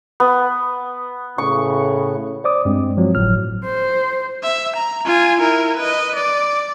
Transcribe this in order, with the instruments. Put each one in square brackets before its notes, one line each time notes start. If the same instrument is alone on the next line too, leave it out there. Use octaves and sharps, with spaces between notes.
[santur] B3
[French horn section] A2 C#3 [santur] C#6
[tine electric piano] C5 D5 D6 D#6
G2 G#3 C4
F3 F#3 C4
G1 A2 F#3 F6
[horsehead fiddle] C5
[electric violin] E5
A#5
F4 G#5
E4 A#4
B4 D#5
D5